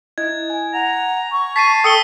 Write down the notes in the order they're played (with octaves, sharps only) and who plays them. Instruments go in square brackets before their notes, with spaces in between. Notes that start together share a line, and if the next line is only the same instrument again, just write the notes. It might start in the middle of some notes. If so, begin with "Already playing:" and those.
[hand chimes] E4 D#5 [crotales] G#6
[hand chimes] G#5
[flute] F#5 [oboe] A#5
[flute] C#6
[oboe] A5 [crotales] B6 C7 D#7
[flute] A4 [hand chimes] G5 E6 [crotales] D#6 C#7 G7